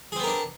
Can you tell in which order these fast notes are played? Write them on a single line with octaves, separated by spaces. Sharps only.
G#4 C4 B3 A#4 D4